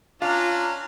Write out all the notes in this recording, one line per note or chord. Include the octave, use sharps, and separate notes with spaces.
C#4 D4 F4 F5 A#5